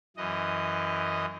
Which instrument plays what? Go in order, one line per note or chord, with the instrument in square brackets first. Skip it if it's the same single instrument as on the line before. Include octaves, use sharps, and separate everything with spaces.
[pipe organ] F#2 E3 D#5